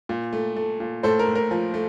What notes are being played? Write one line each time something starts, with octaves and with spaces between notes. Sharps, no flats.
A#2
A3
A3
A#2
A2 A4 C5
A#4
A2
A#4
F3
A3